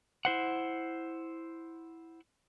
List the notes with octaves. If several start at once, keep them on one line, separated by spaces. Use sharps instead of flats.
E4 C5 F#5